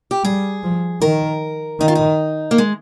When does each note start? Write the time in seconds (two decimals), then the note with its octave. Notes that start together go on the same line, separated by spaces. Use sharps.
0.11 G4
0.24 G3 G#4
0.63 F3
1.02 D#3 A#4
1.80 D#3 D#4
1.88 F4
1.95 D#4
2.51 A#3
2.58 G#3